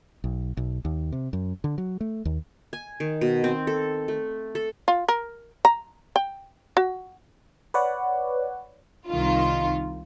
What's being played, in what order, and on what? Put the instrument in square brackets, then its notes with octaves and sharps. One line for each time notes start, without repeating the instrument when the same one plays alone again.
[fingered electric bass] B1
B1
D#2
C3
F#2
D3
F#3
A3
D#2
[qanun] G#5
D#3
B2
C4
A4
A3
A4
[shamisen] F4
A#4
A#5
G5
F#4
[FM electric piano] B4 C#5 D5 F#5
[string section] C2 D#3 F4